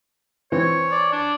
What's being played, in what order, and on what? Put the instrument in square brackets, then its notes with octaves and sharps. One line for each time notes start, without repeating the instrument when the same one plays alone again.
[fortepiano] E3 C4 [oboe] C#5
[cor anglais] D5
D4